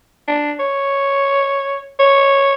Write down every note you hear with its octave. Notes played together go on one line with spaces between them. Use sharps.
D4
C#5
C#5